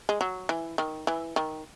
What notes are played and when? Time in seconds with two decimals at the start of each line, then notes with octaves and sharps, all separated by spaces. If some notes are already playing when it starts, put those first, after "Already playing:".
0.09 G#3
0.21 F#3
0.49 E3
0.78 D#3
1.07 E3
1.36 D#3